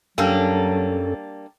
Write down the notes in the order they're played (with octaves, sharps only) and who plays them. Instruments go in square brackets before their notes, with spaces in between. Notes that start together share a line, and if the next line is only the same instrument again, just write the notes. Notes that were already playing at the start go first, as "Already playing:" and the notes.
[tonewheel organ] F#2 C#4 A4 [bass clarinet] F#3 [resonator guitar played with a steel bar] G3 A#3 D4